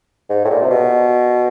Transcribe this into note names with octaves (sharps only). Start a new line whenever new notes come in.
G#2
A2
A#2
C3
B2